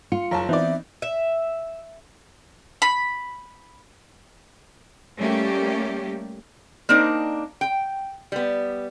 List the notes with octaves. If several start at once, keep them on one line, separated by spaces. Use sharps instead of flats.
F4 C#7
F#1 C#5 F5 A5 A#5
E3 B3 C4 D#4 D5 E5
E5
B5
G3 A3 A#3 C#4 G4
A#3 C4 D4 D#4
G5
G3 B3